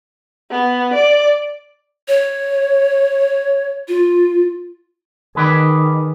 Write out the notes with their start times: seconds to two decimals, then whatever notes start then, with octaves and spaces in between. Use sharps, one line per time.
0.51 B3
0.94 D5
2.08 C#5
3.88 F4
5.35 D#3 G#4 B4 D5